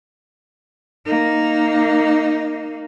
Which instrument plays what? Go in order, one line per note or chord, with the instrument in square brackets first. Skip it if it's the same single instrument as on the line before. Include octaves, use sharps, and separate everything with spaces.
[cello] A#3 D#4